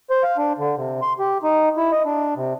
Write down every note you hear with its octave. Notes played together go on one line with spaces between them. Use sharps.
C5
F5
D4
D3
C3
C6
G4
D#4
E4
D#5
D4
C3